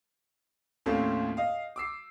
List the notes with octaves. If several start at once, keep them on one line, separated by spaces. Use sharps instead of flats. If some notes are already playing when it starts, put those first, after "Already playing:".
D#2 A2 C4 C#4 F4 A4
D#5 F5
D6 E6 C7